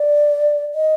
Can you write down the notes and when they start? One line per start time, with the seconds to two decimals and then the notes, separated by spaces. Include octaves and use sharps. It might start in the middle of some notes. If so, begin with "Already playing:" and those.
Already playing: D5
0.74 D#5